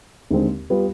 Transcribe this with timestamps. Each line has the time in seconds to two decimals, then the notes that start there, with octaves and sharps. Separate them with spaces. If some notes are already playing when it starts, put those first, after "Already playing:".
0.31 D#2 D3 G#3 C4
0.70 G3 B3 F4